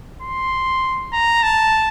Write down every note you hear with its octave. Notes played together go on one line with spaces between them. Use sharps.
C6
A#5
A5